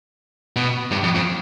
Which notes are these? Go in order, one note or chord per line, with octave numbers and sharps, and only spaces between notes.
B2
G2
F2
F2